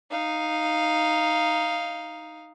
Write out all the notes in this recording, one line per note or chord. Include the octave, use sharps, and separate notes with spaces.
D#4 F5